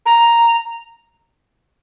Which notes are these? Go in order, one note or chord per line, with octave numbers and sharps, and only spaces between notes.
A#5